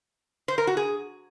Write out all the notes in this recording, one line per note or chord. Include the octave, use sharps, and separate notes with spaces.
C5
A#4
F#4
G#4